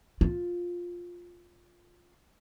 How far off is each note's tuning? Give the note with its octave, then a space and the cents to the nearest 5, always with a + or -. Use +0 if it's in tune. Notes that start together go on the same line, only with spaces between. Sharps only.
F4 +5